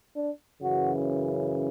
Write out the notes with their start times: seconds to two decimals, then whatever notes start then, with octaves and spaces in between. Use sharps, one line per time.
0.14 D4
0.61 F#2 C#3 E3 F#4